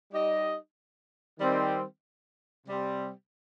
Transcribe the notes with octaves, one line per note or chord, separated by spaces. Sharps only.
G3 D#4 G4 D#5
D#3 G3 C4
C3 G3 C4